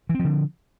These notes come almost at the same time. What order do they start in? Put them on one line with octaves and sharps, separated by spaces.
E3 C4 F3 D3